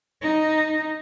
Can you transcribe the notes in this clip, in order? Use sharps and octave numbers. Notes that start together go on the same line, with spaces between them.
D#4